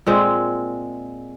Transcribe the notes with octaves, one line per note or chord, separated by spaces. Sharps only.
A#2 G#3 C4